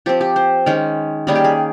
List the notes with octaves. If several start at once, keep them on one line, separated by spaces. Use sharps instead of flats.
F3 C4 G4
G4
C5
D#3 G#3 C#4
D#3 G3 A#3 C#4 G#4
G4
G#4